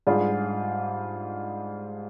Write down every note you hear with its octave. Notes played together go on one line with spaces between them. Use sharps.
G#2 G3 D4 F4 G#4